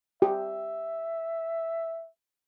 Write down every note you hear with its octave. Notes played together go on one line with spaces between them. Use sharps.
G4 E5